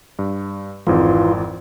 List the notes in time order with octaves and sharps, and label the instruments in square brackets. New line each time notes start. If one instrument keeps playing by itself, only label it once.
[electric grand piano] G2
[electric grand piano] G#1 F2 G#2 [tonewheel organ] E3 F4